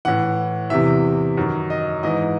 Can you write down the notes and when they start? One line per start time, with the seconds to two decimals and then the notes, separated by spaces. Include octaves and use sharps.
0.05 A2 E3 F#5
0.70 E2 C3 E3 E5
1.37 F#2 D#3
1.70 D#5
2.03 G#2 E3 D#5